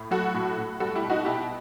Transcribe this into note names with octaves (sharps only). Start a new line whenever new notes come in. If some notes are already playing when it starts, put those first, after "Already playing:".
Already playing: A2
F#3 F#4 A4
A2
A2
G3 F#4 A4
E4 G4
B2
D#4 F#4
B2 E4 G4